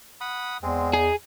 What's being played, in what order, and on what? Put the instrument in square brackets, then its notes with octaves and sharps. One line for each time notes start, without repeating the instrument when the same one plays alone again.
[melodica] F#5 B5 D#6
[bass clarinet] E2 [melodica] G#3 C4
[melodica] D#4 [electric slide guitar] G#4